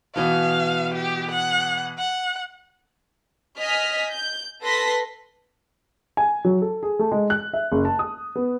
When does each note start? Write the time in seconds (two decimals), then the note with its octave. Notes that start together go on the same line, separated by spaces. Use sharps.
0.16 B2 E3 B3 F5
0.94 G4
1.31 F#5
1.99 F#5
3.60 D#5 G#5 F6 B6
4.10 G6
4.63 A4 B4 C6 A#6 B6
6.17 G#5
6.45 F#3
6.62 A4
6.83 G#4
6.99 A3
7.11 G#3
7.30 F#6
7.53 E5
7.72 F#1
7.85 A5
7.99 D#6
8.36 B3